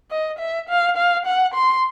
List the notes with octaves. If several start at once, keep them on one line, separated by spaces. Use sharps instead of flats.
D#5
E5
F5
F5
F#5
C6